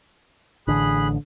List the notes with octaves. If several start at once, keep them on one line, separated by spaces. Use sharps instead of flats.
A1 D3 G#4 B5 F#6